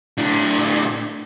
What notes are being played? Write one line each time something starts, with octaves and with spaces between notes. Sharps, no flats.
A2 D4